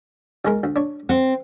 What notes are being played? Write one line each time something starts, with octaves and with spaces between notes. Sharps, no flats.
B1 G#3 A#4
D2
D4 C#5
C4 F#5